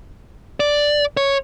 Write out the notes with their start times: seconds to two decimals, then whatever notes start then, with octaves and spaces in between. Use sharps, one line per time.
0.60 D5
1.17 C#5